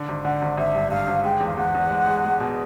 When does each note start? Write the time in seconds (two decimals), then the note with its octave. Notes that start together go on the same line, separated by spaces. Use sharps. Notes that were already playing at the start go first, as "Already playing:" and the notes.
Already playing: D3
0.09 G#1
0.24 D3 F#5
0.42 G#1
0.57 G#1 E5
0.75 G2
0.90 G2 F5
1.07 G#1
1.24 G#3 G5
1.40 E2
1.47 F5
1.57 E2 F#5
1.75 E2
1.91 G#3
2.07 G#3
2.24 G#3
2.40 B2